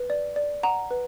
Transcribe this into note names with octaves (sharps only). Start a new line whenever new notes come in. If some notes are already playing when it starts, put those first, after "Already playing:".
Already playing: B4
D5
D5
F#5 A#5
B4